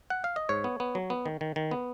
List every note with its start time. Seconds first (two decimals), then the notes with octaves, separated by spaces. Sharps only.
0.10 F#5
0.24 F5
0.36 D#5
0.49 G#2 C#5
0.64 B3
0.80 B3
0.95 F#3
1.10 B3
1.25 D#3
1.41 D#3
1.56 D#3
1.71 B3